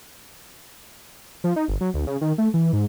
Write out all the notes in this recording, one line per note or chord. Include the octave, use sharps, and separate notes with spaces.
F3
D#4
G1
F#3
D2
C#3
D#3
A3
E3
G#2